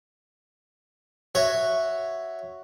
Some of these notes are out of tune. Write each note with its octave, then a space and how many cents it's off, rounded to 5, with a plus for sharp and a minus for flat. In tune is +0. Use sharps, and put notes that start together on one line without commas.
F#4 +0 C#5 +0 E5 +0